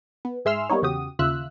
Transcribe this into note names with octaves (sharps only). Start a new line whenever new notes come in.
B3
G#2 G#4 E5 C6 E6 F6
G3 A#3 B3 D#4 C#5
E2 C#3 F#4 G4 D#6
D#2 C#3 F4 E5 E6 F#6